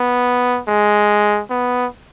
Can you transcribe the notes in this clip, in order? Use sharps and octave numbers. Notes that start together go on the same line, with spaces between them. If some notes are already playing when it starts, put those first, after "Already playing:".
Already playing: B3
G#3
B3